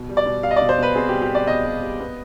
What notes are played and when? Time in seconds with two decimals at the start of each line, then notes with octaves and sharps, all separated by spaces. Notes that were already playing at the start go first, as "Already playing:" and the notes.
Already playing: B2
0.09 G3
0.17 D5
0.26 B2
0.43 G3 F5
0.51 D#5
0.56 D5
0.61 B2
0.69 C5
0.78 B2 B4
0.95 C4 G#4
1.09 G4
1.13 G3
1.22 G4
1.30 C4 D5
1.47 B2 D#5
1.65 G3
1.83 G3
2.00 B3